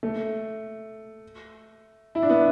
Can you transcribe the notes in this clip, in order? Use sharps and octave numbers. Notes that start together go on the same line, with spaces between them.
A3
E4
D4
B3